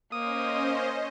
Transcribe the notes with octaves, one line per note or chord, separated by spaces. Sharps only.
A#3 C#4 C5 D#5 D#6